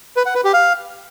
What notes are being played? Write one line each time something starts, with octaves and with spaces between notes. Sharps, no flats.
B4
F#5
B4
G4
F5